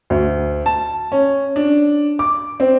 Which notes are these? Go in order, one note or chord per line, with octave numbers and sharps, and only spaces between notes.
D2
A5
C#4
D4
D6
C4